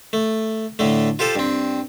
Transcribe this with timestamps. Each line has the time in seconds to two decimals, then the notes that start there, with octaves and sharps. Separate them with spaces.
0.13 A3
0.79 A2 D3 A3
1.19 F4 G4 A4 C5
1.36 G2 C4